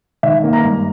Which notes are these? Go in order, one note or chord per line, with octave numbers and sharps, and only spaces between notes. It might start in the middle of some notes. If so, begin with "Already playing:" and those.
D#3 E5
A#3
A#5
G2